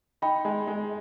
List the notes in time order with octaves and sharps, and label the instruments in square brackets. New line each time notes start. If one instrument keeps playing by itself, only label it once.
[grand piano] D#4 [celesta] G5 B5
[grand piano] G#3
G#3